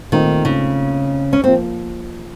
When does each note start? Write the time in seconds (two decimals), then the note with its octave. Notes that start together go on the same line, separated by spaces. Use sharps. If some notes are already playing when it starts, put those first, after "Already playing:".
0.12 A#2 D#3 A3 C4 D#4
0.45 C#3
1.33 C#4
1.44 F3 A#3 C4